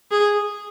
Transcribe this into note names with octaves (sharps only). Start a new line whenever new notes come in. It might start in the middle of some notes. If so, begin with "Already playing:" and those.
G#4